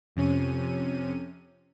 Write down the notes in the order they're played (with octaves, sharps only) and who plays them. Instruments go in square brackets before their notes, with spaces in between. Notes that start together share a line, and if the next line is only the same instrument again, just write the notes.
[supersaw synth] F2 C3 C#4 D#7